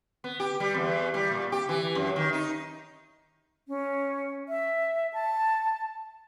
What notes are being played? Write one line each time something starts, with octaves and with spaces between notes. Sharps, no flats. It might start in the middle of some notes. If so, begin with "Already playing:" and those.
B3
G4
G3
E2
G3
A#2
G4
E3
F#2
D#3
D#4
C#4
E5
A5